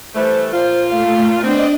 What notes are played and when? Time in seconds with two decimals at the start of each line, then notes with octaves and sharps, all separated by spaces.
0.15 E3 G3 A3 C5
0.53 A#2 F4 C5
0.89 A3 F5
1.43 B3 C4 D4 D5 D#5